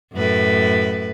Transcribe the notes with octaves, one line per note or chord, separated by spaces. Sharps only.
F#2 A2 B4